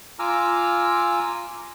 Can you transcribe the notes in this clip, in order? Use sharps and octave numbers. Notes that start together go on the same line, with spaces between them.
F4 G#5 A#5 D6 E6 F6